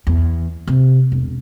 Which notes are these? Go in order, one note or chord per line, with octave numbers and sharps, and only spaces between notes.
E2
C3
E1